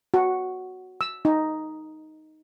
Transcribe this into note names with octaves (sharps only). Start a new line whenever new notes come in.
F#4
E6
D#4